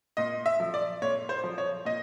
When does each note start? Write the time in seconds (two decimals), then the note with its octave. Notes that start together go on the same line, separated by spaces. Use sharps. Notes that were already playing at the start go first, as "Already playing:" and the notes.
0.17 A#2 D#5
0.46 E5
0.60 F3
0.74 D5
1.02 A#2 C#5
1.29 C5
1.44 F3
1.58 C#5
1.85 A#2 D#5